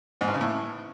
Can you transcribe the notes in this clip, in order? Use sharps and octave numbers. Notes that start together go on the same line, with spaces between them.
G#2
G2
C#3
A2